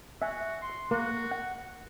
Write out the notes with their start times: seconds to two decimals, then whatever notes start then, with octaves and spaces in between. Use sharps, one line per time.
0.22 F#4 E5 G#5
0.62 C6
0.91 A#3 F#4
1.31 F#5